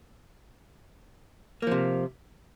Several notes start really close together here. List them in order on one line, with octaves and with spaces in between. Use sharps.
A#3 F3 C3